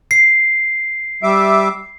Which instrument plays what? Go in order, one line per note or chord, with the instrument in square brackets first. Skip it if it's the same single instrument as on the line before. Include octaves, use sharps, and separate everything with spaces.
[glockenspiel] C7
[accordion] G3 E5 D6